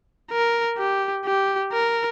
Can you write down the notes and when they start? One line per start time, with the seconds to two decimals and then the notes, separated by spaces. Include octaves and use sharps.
0.32 A#4
0.78 G4
1.25 G4
1.73 A#4